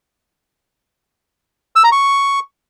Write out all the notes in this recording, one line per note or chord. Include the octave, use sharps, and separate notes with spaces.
E6
A#5
C#6